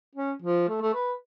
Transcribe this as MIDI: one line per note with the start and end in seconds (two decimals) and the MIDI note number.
0.15 0.32 61
0.42 0.69 53
0.69 0.80 57
0.81 0.93 57
0.94 1.13 71